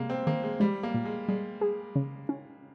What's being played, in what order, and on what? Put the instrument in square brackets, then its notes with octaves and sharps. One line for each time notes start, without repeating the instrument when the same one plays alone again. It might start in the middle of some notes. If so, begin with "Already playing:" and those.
Already playing: [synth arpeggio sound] C3 [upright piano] G3 G#3 A#3
[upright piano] C4
[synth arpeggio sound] D#3 [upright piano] A#3
[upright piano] G#3
[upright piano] G3 [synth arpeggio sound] G#3
[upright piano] A#3
[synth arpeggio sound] A#2
[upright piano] G#3
[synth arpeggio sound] G3 [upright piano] G#3
[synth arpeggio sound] G#4
C#3
C#4